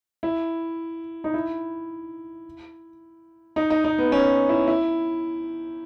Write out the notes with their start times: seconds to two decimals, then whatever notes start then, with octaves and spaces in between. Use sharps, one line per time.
0.23 E4
1.24 D#4
1.34 E4
3.56 D#4
3.70 D#4
3.84 D#4
3.98 B3
4.12 C#4
4.49 E4
4.68 E4